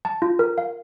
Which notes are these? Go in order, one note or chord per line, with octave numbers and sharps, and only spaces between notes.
A5
F4
A#4
F5